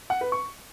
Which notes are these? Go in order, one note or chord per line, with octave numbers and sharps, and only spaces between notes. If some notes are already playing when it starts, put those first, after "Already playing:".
F#5
B4
C#6